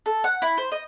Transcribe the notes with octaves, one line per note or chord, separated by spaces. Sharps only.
A4
F#5
E4
C5
D#5